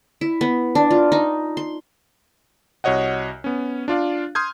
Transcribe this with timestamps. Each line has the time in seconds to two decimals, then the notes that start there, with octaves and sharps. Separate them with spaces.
0.21 E4
0.41 B3
0.75 D4
0.91 F4
1.12 D#4
1.57 C6
2.84 C2 F#4 C#5 D#5 F#5
3.44 B3 C#4
3.88 D4 F4 D5 F5
4.35 C6 D#6 F6 G6 G#6